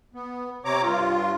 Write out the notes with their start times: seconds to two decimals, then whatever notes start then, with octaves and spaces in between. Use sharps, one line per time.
0.14 B3
0.65 C3 C4 C#5 A#5 D6
0.83 G2 F4